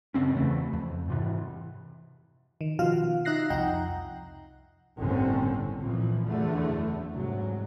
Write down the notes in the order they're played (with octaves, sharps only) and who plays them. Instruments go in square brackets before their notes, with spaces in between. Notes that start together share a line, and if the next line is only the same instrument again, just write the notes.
[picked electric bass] F#2 C#3 C4 C#4
E2 C#3 E3 A3
F2
G#2 C3 E3
[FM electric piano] D#3
B2 D#3 F3 F4 F#4 F5
D#4 E5 F#6 A#6 C7
C2 F2 D#4 F#5 G5 A#5
[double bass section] G1 C2 A2 D3 C4 C#4
A#2 E3 F3
F#1 E2 D3 A3
C2 G#2 F#3